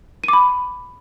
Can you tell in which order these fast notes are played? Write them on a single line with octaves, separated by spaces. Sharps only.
D#7 D6 B5